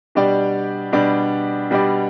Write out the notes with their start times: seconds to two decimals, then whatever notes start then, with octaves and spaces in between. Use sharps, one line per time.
0.15 B2 G3 D4 G4 D5
0.93 B2 G3 D4 G4 D5
1.71 B2 G3 D4 G4 D5